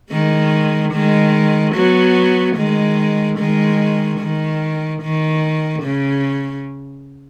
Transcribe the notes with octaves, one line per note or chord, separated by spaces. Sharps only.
D#3 G#3
D#3 G#3
F#3 B3
D#3 G#3
D#3 G#3
D#3
D#3
C#3